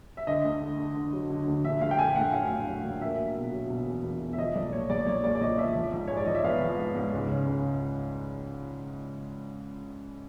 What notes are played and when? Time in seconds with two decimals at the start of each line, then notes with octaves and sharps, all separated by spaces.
0.17 E5
0.27 D3 D#5
0.44 D2
0.61 D3
0.78 D3
0.96 D3
1.13 F#3
1.30 D3
1.47 D2
1.64 A#1 E5
1.81 A3 F5
1.91 G5
1.99 A3 G#5
2.09 G5
2.16 A2 F#5
2.33 F#3 F5
2.50 A2
2.67 F#3
2.84 A#1
3.01 A#3 E5
3.19 F#3
3.35 B2
3.52 F#3
3.70 B2
3.87 E2
4.04 B2
4.22 B2
4.33 E5
4.38 F3 D#5
4.55 B1 D5
4.73 A#2 C#5
4.90 B1 D5
5.06 B1 C#5
5.24 A#2 D5
5.35 D5
5.41 F3 D#5
5.58 F3 E5
5.75 F3
5.92 G#2
6.07 G#3 C#5
6.17 D5
6.26 F3 D#5
6.35 E5
6.44 B3 F5
6.61 F3
6.78 G#2
6.95 G#2
7.12 C#2
7.29 C#3
7.47 C#2